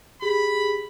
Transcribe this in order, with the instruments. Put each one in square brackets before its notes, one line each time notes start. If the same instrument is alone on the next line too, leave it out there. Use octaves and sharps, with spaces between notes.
[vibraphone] G4 G#4 [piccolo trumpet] B5